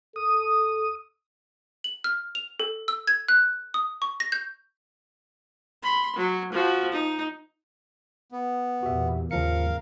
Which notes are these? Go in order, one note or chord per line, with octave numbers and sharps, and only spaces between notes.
A4 D#6
F#7
F6
F7
A4
E6
G#6
F#6
D#6
C#6
A#6
G6
B5 C6
F#3
F3 F#4
D#4
B3
E2 A#2 F#4 G4 E5
D#2 G#2 C#3 F3 A#4 F5 C#7